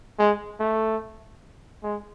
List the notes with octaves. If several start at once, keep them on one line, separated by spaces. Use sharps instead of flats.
G#3
A3
G#3